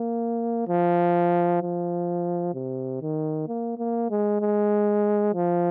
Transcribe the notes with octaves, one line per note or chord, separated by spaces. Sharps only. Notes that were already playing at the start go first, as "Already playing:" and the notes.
Already playing: A#3
F3
F3
C3
D#3
A#3
A#3
G#3
G#3
F3